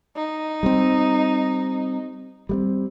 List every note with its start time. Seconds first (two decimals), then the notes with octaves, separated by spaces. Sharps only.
0.15 D#4
0.63 G3 A#3 C4
2.49 G3 G#3 C4